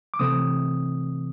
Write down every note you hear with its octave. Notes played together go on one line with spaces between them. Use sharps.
D6
C3 E3 A3 C4 D#6